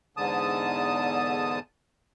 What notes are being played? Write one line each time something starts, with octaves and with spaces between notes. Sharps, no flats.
E2 G#2 D3 A5 D#6